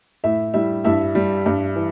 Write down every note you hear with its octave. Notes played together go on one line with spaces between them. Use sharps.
A2 E4 E5
G3 E4 E5
G2 E4 E5
G3
G2
E3